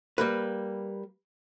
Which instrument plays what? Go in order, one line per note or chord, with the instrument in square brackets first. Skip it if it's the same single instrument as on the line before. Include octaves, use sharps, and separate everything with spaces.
[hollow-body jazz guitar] G3 A#3 B4